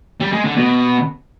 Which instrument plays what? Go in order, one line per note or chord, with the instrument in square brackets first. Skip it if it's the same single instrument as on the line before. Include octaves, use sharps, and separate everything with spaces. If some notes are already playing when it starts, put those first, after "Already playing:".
[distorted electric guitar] G3
G#3
D3
B2